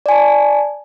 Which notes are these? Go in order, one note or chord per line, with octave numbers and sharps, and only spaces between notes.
D5 G#5 A5